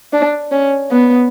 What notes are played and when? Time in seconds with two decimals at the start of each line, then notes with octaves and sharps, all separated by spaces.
0.13 D4
0.51 C#4
0.91 B3